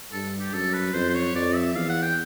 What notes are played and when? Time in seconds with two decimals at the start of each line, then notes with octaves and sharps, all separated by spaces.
0.12 G2 A4
0.40 G4
0.53 F#2 A4
0.74 B4
0.94 F2 C5
1.09 C5
1.15 C#5
1.35 F2 D5
1.55 E5
1.75 E2 F5
1.89 F#5
2.02 G5